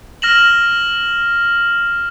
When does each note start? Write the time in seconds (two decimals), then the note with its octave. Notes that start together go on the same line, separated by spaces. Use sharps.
0.22 F6 A#6 E7 F#7